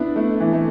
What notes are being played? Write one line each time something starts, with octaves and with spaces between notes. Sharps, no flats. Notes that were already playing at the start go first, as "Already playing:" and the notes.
Already playing: B3 D4 E4
A3
E3
A3